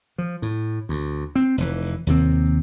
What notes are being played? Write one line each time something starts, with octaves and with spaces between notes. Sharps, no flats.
F3
A2
D2
C4
F1 E3
D#2 C3 C4